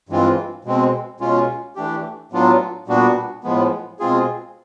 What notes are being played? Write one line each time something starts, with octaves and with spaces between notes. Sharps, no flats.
G2 E3 G#3 C4 F4
B2 G#3 C4
B2 G#3 C#4 F4
E3 A3 D4 G4
A2 F#3 B3 D4 F4
A#2 G3 B3 D4 F#4
A2 F3 G#3 B3
B2 G#3 C4 F4 G#4